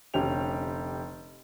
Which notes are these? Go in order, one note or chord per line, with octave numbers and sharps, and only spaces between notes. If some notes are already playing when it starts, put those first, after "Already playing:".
F1 D3 C#4 G4 F7